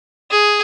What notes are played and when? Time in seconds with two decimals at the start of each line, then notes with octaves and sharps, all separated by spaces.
0.31 G#4